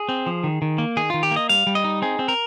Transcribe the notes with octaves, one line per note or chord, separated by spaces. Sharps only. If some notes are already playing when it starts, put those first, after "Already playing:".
Already playing: G#4
C4
F3
D#3
D#3
A#3
D#3 G#4
D#3 F4
G4
A#3 D#5
G3 F5
G3
D#5
D#4
C4 G#4
C4
A#4